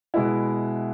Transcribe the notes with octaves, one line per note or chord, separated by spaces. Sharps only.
B2 G#3 B3 E4